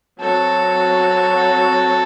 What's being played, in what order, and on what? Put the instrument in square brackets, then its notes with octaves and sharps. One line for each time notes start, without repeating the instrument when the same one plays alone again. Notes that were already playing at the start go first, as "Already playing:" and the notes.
[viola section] F#3 C4 F#4 [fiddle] A4